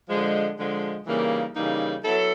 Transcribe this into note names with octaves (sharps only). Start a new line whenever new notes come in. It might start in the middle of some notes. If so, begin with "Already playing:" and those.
D3 F3 G#3
D3 F3 G#3
C#3 E3 G3 A#3 D#4
C#3 E3 G3 A#3 D#4
F#3 B3 E4 A4